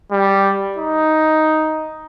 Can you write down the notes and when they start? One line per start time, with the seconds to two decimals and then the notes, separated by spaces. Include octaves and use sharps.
0.12 G3
0.78 D#4